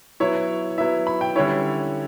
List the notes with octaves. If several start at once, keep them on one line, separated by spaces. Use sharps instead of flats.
F#3 B3 E4 C#5
F#3 B3 E4 E5
B5
G5
D3 G3 C#4 E4 C#5